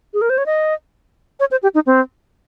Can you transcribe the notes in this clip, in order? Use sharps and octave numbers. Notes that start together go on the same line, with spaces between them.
G#4
A#4
C5
C#5
D#5
C#5
C5
G4
D#4
C4